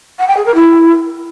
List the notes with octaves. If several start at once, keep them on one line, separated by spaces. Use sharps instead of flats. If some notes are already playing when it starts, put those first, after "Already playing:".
F#5
G5
G#4
A#4
E4